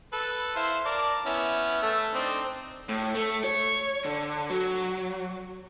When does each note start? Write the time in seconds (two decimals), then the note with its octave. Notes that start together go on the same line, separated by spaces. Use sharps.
0.13 A4 B4
0.56 E4 C5 F5
0.85 A#4 D5 A5
1.26 B3 C#4 E4
1.83 A3 A4 E5
2.14 C4 D4 D#4
2.89 A2
3.15 A3
3.44 C#5
4.05 D3
4.50 F#3